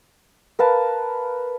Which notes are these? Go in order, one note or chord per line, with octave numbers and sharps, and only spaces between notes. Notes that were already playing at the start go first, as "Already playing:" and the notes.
A#4 B4 F5 A5